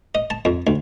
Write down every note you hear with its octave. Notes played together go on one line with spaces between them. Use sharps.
D#5
A5
F2
D2